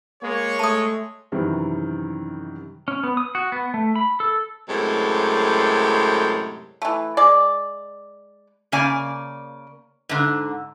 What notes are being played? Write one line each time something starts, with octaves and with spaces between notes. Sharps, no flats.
G#3 A#3 C#5
A3 A5 D#6
F#2 C3 D#3 E3 G3 C4
C#4
B3
D#6
F#4
B3
A3
B5
A4
F#2 A2 C3 G#3
E3 A3
G#3 D5
C#3 A#3 D5 G#5
G#2 D3